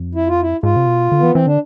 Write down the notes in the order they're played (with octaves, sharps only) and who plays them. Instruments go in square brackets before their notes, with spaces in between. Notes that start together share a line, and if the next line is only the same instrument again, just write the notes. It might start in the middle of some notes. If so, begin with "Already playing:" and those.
Already playing: [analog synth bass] F2
[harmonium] E4
F4
E4
[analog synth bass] G#2 [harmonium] F4
[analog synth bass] C3
B2
D3
[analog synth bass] E3 [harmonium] B3
[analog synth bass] E3 [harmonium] C4
[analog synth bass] D3 [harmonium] D4